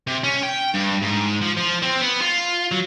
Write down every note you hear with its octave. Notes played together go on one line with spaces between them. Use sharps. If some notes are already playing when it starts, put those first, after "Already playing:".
C3
C#4
G5
G2
G#2
F3
F3
C4
B3
F4
F#3